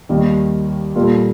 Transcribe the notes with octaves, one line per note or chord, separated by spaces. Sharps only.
D#2 D#3 G3 A#3 D#4
A#2 G3 A#3 F4 A4